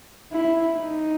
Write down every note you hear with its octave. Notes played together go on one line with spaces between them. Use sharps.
E4
D#4